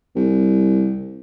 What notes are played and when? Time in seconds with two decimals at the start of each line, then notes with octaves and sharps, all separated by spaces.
0.16 C2